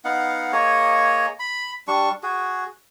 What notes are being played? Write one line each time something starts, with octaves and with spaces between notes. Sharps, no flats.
B3 D#4 F5 F#5
A#3 G#4 C#5 D#5
B5
G3 D4 C#6
F#4 G#4